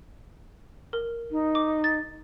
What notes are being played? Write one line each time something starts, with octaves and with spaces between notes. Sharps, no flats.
A#4
D#4
D6
A6